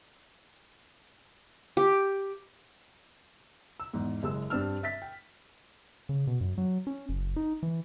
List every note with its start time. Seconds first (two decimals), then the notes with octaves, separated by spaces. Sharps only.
1.77 G4
3.80 E6
3.94 E2 G#2
4.23 F#1 G#3 E6
4.50 G2 G3 C4 D4 E6 F6
4.83 E5 A6 B6
5.02 G5
6.09 C#3
6.27 B2
6.41 F#2
6.58 F#3
6.87 C#4
7.09 F#1
7.36 D#4
7.63 E3